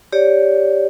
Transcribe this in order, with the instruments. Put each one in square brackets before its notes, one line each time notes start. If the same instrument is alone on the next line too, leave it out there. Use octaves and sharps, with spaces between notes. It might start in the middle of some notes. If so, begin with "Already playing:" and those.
[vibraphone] G4 C#5 D5